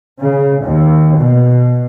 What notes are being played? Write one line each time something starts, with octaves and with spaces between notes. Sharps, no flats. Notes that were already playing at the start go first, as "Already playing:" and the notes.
C#3
D#2
B2